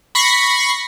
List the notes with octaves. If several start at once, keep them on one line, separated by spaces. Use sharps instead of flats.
B5 C#6 A#6 C7